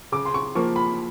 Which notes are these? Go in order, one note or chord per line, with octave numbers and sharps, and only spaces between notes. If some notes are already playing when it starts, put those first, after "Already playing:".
C#3 D6
C6
C#6
F3 A#3 C#6
B5